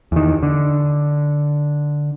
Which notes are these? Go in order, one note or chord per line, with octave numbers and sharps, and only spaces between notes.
E2 D#3
D3